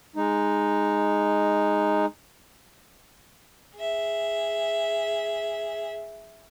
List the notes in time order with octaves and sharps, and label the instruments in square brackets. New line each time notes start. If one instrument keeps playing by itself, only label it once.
[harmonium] G#3 D#4
[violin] G#4 E5